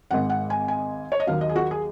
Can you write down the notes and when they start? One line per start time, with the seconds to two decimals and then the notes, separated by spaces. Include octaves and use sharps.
0.11 G#1 G#2 D#3 G#3 F#5
0.30 F#5
0.50 G#5
0.68 G#5
1.12 C#5
1.20 D#5
1.27 D#2 D#3 F#3 F5
1.41 D#5
1.49 G#4
1.56 F#4
1.71 G#4